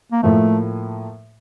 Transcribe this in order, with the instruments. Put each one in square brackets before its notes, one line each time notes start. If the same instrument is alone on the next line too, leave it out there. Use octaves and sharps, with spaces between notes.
[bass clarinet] A#3
[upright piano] A2 F3 A#3 [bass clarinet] A3